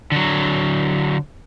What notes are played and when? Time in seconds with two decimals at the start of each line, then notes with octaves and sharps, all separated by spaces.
0.12 D3 F#3